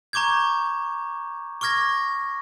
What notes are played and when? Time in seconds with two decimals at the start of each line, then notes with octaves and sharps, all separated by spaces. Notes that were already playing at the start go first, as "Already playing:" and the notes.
0.13 A#5 C#6 D6 G6 G#6
1.61 C#6 D6 F6 G#6 A#6